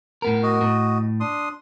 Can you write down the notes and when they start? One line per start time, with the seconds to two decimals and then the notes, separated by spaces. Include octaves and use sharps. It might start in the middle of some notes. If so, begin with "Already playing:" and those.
0.22 A2 B3 A#4
0.43 F#4 D#5
0.61 A2
1.20 D4 C6 D#6